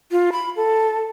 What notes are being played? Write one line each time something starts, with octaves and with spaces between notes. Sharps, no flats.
F4
B5
A4